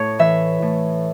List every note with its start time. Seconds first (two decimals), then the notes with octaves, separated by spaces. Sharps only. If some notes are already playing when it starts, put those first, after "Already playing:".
Already playing: A2 C#5
0.19 E3 E5
0.62 A2